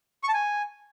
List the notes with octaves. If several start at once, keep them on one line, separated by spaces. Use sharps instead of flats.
C#6
A5
G#5